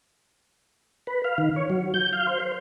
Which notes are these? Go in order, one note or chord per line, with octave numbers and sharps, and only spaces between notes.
B4
F5
D#3
C#5
F#3
G6
F5
C5
C5